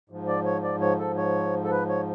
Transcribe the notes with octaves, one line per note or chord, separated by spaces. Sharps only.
G#2 F3
D5
C#5
D5
C#5
A4
C#5
A4
B4
C#5